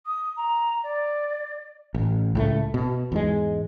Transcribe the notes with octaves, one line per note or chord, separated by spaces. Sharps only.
D#6
A#5
D5
A1
C#2 A2 A3
B2
E2 G#2 G#3